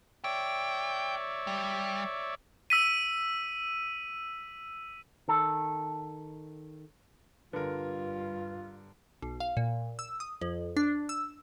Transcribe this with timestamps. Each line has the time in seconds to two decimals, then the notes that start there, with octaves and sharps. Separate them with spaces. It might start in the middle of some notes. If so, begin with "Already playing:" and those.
0.24 C#5 D5 E5 G5
1.47 G3
2.70 E6 B6 D#7
5.28 D#3 A4
7.53 G2 D3 F4 A#4 B4
9.22 B1
9.40 F5
9.57 A#2
9.99 E6
10.20 D#6
10.41 F2
10.77 D4
11.09 E6